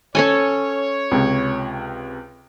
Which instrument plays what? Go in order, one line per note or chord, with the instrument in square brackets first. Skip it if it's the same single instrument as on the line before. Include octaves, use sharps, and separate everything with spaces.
[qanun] C#4 A4 G#5 [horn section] C#5
[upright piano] C#2 C3